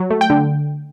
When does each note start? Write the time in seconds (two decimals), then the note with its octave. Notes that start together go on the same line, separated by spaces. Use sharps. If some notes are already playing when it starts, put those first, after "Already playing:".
Already playing: F#3
0.10 A3
0.21 G5
0.30 D3